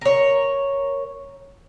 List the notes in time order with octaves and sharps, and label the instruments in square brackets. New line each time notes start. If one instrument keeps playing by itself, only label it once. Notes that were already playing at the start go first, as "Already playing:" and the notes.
[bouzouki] A#4 C#5